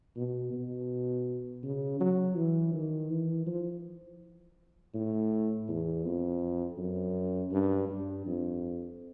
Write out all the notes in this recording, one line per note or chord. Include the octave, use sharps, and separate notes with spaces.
B2
B2
C#3
F#3
E3
D#3
E3
F3
A2
E2
F2
F#2
G2
G2
F2